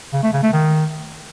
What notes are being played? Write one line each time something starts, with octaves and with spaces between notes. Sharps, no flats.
C#3
A3
C#3
A3
D#3